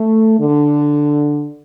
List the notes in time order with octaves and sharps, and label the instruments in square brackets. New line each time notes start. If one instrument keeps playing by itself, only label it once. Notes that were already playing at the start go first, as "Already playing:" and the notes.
Already playing: [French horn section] A3
D3